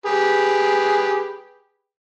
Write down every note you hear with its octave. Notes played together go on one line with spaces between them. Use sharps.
G4 G#4 B4